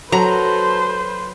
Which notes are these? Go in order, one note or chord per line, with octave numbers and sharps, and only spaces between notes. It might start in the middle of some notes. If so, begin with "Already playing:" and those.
F#3 A4 B4 C5 A#5